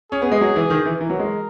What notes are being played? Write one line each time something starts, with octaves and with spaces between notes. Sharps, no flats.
C#4 G#4
B3
G#3
F#3
E3
D#3
E3
E3 A#4
F#3
G#3